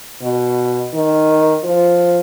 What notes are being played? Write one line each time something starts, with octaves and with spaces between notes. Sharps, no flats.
B2
D#3
F3